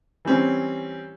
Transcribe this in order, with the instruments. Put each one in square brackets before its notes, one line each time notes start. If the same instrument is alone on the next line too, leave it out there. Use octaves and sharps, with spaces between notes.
[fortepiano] E3 G3 C4 C#4